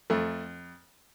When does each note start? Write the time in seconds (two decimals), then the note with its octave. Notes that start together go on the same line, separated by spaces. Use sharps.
0.10 F2 A3